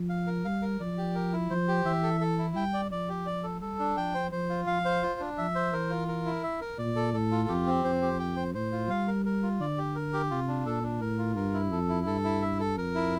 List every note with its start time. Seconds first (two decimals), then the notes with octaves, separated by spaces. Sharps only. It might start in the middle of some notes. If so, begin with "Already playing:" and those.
Already playing: F3
0.09 F5
0.27 A#4
0.45 G3 F5
0.62 A#4
0.80 F3 D5
0.98 G4
1.15 A#4
1.33 E4
1.50 F3 C5
1.68 G4
1.85 E3 E5
2.03 A4
2.20 A4
2.38 E4
2.56 G3 G5
2.74 D5
2.91 F3 D5
3.09 G4
3.26 D5
3.44 A4
3.62 G3 A4
3.79 D4
3.97 F3 G5
4.14 C5
4.32 F3 C5
4.50 F4
4.67 F3 F5
4.85 C5
5.03 F4
5.20 D4
5.38 F3 E5
5.55 C5
5.73 E3 A#4
5.90 F4
6.08 A#4
6.26 E4
6.43 E5
6.61 A#4
6.78 A#2 D5
6.96 A4
7.14 A2 A4
7.31 F4
7.49 F2 G4
7.66 C4
7.84 F2 C5
8.02 G4
8.19 G5
8.37 C5
8.55 A2 C5
8.72 F4
8.90 G3 F5
9.08 A#4
9.26 A#4
9.43 F4
9.60 D3 D5
9.78 G4
9.95 A#4
10.13 G4
10.31 C3 F4
10.48 D4
10.66 A#2 A4
10.83 D4
11.01 A2 A#4
11.18 F4
11.36 G2 A#4
11.54 E4
11.72 F2 A4
11.89 E4
12.07 G2 A4
12.24 E4
12.42 E5
12.60 A4
12.77 F2 A#4
12.95 E4